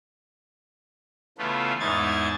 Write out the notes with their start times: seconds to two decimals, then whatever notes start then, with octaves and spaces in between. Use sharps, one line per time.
1.38 C#3 E3 A3 B3 F4
1.80 E2 G#2 D#4 E4 G#6 A6